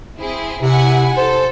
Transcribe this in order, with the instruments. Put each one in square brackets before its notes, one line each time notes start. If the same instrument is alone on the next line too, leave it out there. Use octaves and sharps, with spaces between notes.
[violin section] C4 E4 G#4
[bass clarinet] C3 [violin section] E4 F#5 G#5
[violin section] A4 [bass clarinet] C5